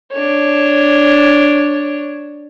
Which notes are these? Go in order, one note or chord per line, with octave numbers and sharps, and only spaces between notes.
D4 C#5